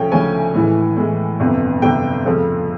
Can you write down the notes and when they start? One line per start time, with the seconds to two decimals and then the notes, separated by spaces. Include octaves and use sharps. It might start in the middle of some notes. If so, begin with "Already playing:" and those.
Already playing: D2 C#3 F3 A3 C#4 G5
0.12 D2 C#3 F3 A3 C#4 G#5
0.54 A2 E3 G#3
0.97 A2 E3 G#3
1.40 G1 F2 C3
1.82 G1 F2 C3 G5
2.25 F2 C#3 F3 A3